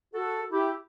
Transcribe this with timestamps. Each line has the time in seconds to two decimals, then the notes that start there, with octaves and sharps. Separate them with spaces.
0.14 F#4 A4
0.51 E4 G4